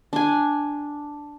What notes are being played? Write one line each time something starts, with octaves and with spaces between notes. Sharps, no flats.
D4 G#5